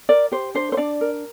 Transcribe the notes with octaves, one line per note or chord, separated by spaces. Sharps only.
A#4 D5
G4 C5
D4 C5
C5
D4 D5
A#4